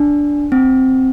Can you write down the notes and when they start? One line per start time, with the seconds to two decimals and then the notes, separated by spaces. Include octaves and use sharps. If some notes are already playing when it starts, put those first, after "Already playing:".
Already playing: D4
0.52 C4